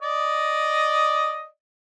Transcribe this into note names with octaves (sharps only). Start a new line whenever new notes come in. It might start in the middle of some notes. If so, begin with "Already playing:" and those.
D5 D#5